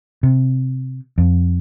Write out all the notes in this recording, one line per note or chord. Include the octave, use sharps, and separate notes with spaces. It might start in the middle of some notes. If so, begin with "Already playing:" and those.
C3
F2